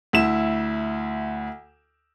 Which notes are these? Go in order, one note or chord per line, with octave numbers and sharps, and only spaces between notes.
D2 E4 E7